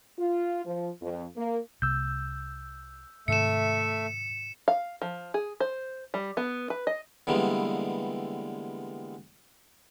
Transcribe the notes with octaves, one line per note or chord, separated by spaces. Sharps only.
F4
F3
F2
A#3
C2 C3 A#3 E6 G6
G#2 C3 D#3 A3 E5 C#7 E7
F5
F3
G#4
C5
G3
B3
B4
D#5
D3 E3 G3 G#3 A#3 B3